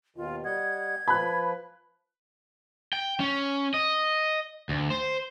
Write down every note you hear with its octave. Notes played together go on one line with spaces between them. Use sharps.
D#2 B2 D#3 F4
G3 D#5 F#5 G#6
F3 B4 B5 F#6
G5
C#4
D#5
D2
C5